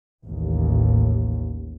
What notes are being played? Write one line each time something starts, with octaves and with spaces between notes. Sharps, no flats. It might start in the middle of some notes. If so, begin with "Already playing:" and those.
A1 D#2